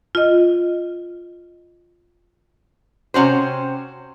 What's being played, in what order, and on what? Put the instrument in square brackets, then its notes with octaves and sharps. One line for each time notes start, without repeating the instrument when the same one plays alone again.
[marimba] F4 D#5
[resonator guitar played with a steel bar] C3 C#4 F#4 C5